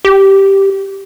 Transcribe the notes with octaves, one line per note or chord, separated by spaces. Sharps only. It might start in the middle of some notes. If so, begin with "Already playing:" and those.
G4